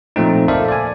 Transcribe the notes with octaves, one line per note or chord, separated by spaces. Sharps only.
A#2 F3 A3 C4 D#4
A4 A#4 C5 D5 E5 F5
D5 G#5